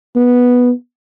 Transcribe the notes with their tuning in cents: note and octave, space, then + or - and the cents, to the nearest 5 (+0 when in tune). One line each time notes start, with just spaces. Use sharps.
B3 -5